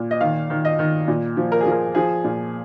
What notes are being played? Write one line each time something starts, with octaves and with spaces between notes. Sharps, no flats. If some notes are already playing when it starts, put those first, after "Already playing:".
Already playing: A#2
D#5
D#3 F5
D#3
D#5
D#3
A#2
F3
A#4
G#4
F3
A#4
F3 G#4
A#2